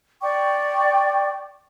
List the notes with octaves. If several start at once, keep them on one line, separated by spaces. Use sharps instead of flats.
D5 G5 C#6 D6